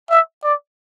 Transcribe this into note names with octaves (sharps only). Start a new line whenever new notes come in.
E5
D5